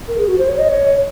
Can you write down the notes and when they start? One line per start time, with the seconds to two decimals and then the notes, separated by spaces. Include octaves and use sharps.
0.08 A#4
0.18 G#4
0.28 F#4
0.38 C5
0.48 C#5
0.58 D#5
0.69 C#5